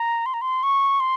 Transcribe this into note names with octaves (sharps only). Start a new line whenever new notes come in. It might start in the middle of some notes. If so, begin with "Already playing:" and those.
Already playing: A#5
C6
A#5
C6
C#6
C6